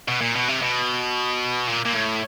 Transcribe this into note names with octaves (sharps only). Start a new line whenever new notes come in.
B2
A#2
B2
C3
B2
A#2
A#2
A2